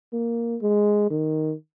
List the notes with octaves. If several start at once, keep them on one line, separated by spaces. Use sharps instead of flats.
A#3
G#3
D#3